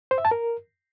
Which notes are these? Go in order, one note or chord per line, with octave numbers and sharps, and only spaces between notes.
C5
E5
A5
A#4